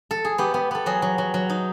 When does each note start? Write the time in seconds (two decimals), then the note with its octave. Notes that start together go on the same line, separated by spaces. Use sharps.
0.11 A4
0.25 G#4
0.38 B3 G4
0.54 B3
0.71 B3 A4
0.86 F#3 G#4
1.02 F#3
1.18 F#3
1.34 F#3
1.50 D#4